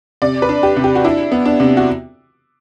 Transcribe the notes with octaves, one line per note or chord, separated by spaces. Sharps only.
C3 D5
B4
D4
G4
C3
G4
F#4
D4 E4
B3
D4
C3
F#4